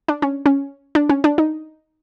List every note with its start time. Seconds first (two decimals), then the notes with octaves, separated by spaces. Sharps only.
0.08 D4
0.22 C#4
0.46 C#4
0.95 D4
1.09 C#4
1.24 D4
1.38 D#4